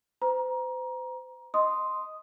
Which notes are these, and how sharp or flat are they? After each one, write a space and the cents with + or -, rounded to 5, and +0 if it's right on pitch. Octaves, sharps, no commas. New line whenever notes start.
C5 -40 A#5 +25
D#5 +0 C6 +0 D#6 +0